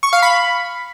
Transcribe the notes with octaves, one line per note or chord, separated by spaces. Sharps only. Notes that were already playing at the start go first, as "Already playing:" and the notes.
C#6
F5
B5